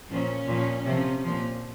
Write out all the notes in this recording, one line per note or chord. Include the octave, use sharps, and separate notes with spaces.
A#2 F3 C#4
A#2 F3
C3 F3
A#2 F3